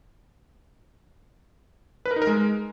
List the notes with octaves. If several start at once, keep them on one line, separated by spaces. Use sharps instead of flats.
B4
A#4
D#4
A#4
G#3